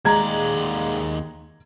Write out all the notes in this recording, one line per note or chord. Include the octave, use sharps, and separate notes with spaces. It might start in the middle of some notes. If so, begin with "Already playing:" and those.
D#2 G#3 D5 A#5 G#6